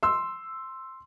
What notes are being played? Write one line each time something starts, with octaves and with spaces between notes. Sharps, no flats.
C6 E6